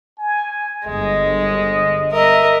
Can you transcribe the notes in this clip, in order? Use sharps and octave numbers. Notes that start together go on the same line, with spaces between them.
G#5
G1 G#3 D#5
A#4 D#5 E5